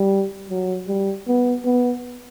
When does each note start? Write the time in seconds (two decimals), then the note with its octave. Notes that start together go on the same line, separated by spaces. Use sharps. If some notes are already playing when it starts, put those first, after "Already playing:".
Already playing: G3
0.50 F#3
0.88 G3
1.27 B3
1.65 B3